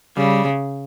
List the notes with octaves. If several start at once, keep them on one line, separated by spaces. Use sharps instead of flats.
C#3 G3